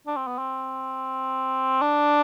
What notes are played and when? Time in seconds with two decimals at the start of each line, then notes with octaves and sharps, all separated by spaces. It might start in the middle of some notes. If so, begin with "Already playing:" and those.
0.07 D4
0.17 C4
0.27 B3
0.38 C4
1.81 D4